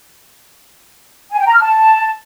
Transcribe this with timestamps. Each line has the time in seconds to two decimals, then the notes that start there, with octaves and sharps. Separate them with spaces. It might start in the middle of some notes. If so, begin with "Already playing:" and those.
1.32 G#5
1.39 G5
1.46 A#5
1.54 F6
1.61 A5